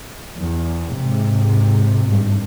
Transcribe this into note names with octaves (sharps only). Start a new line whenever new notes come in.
E2
G#2 C3
G#1 G2